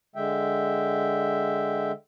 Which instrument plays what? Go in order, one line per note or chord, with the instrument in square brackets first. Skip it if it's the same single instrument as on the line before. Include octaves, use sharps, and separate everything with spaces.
[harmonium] D3 G#3 E5 G5